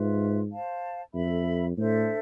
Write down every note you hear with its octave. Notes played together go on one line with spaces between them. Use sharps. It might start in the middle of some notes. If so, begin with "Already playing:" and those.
Already playing: G#2 F4 B4 E5
C5 F5 A5
F2 A4 E5 B5
A2 D4 A4 C5 E5